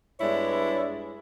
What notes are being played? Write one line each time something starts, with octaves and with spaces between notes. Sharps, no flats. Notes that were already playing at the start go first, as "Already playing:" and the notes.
G2 G#3 B3 E4 C#5 D5